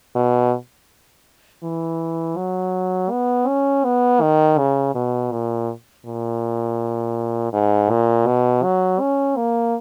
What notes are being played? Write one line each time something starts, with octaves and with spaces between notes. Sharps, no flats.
B2
E3
F#3
B3
C#4
B3
D#3
C#3
B2
A#2
A#2
G#2
A#2
B2
F#3
C#4
A#3